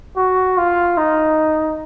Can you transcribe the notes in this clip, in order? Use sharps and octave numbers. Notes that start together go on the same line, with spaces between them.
F#4
F4
D#4